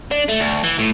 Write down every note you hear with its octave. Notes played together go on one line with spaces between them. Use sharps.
D4
A3
D2
E3
A2